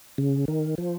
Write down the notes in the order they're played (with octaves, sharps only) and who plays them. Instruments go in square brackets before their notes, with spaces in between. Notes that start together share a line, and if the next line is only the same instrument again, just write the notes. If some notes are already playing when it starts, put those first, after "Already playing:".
[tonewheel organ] C#3
D#3
F3